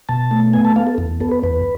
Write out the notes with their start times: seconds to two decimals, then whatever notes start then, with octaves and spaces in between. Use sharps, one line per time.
0.09 B2 A5
0.31 A3
0.53 B3 G#5
0.65 A5
0.76 B3 F5
0.87 A4
0.98 E2
1.20 B3 A4
1.32 B4
1.43 E2 B4